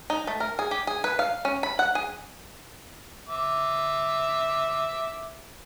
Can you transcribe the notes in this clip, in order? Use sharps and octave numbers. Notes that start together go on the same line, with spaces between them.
D#4
A3
A#4
G#4
G4
G#4
B4
F5
C#4
B5
F#5
G#4
E5 D6